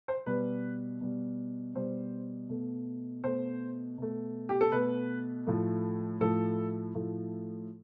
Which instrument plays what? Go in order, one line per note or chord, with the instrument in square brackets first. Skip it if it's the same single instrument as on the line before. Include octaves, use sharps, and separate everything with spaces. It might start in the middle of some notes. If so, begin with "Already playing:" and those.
[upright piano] C5
B2 G3 B4
B2 G3
B2 G3 C5
B2 A3
B2 A3 C5
B2 A3
G4
A4
B2 A3 B4
A2 F3 A3
A2 F3 A3 A4
A2 F3 A3